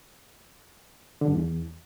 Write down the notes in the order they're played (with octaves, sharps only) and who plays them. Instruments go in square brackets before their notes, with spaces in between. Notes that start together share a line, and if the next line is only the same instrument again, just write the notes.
[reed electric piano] D3
G2
E2